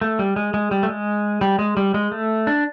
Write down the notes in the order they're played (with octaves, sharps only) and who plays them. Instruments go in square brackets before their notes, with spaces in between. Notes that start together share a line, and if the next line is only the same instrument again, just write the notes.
[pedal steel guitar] A3
G3
G#3
G#3
G3
A3
G#3
G3
G#3
G3
G#3
A3
D4